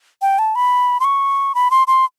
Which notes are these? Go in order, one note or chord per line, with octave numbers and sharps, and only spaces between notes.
G5
A5
B5
C6
C#6
B5
C6
C6